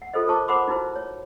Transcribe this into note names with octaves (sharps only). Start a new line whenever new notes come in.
F#5
F4 A4 B4 C5 D#5
F4 A#4 C5 A5 C#6 D6
A#4 C5 F#5 B5 C6 D6
D#4 E4 F#4 B4 C5
C#5